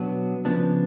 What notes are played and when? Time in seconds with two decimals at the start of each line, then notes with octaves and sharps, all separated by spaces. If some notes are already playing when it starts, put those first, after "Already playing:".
Already playing: B2 F#3 B3 D4
0.45 C#3 F3 B3 D4